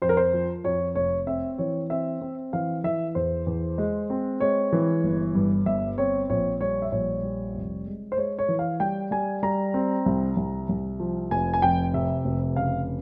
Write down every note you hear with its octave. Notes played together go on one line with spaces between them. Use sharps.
F2 C5
A#4
C5
F3
F2 C#5
F1 C#5
C4 E5
E3 C#5
C4 E5
C4
E3 F5
E3 E5
E2 C5
E2
G#3
C4
G#3 C#5
E3
G1
G2
G1 E5
C4 C#5
A#1 C#5
G3 C#5
E5
A#1 C#5
G3
F1
G#3
C5
G#3 C#5
C#5
E3
F5
G3 G5
G3 G#5
G3 A#5
C4
C2
C2
C2
F3
F1 G#5
G#5
F2 G5
C3 E5
F1
C#3 F5